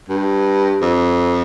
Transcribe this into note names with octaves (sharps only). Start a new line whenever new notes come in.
G2
F2